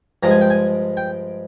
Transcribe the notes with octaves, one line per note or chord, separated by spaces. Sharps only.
G2 F3 G#3 A#5
G#5
G5
G#5
G5